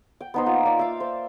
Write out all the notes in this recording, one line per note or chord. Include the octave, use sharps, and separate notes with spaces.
G5
B3 D#4 C5
A#3 F4
A#3 D5
E5 F5
C5